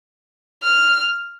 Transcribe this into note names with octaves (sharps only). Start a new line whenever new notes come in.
F6